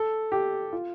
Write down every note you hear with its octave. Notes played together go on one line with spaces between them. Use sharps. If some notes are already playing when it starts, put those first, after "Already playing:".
Already playing: A4
G4
F4